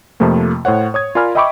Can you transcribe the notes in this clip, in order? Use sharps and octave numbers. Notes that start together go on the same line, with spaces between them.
F2 C3 F3 A3 A#3
A2 C5 C#5 F#5
C#5 D#6 G#6
F4 A#4 D5 G#5 B5 F6
D#5 E5 G5 B5 C#6 D6